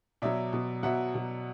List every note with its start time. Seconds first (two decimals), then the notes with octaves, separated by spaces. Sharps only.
0.22 B2 F#3 D5 E5
0.53 B2 F#3
0.83 B2 F#3 E5 F#5
1.14 B2 F#3